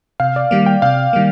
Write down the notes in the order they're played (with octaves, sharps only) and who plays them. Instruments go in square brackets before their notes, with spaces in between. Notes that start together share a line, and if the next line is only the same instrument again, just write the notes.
[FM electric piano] C3 [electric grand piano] F5
[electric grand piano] D5
[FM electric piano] D#3 G3 A#3
[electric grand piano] G5
[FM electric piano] C3 [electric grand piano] F5
[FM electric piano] D#3 G3 A#3